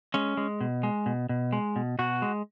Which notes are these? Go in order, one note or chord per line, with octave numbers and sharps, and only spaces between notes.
G#3 C#4
G#3
B2
G#3
B2
B2
G#3
B2
B2 F#4
G#3